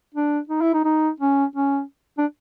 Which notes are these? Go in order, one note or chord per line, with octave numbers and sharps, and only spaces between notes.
D4
D#4
E4
D#4
D#4
C#4
C#4
D4